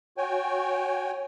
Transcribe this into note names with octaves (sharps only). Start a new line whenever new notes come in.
F#4 C#5 G5 G#5